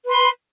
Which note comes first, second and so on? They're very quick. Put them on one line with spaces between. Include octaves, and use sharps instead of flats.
B4 C6 B5